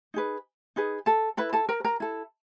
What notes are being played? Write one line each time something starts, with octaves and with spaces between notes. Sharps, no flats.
D#4 G#4 B4
D#4 G#4 B4
A4 A5
E4 A4 B4 B5
A4 A5
A#4 A#5
A#4 A#5
E4 A4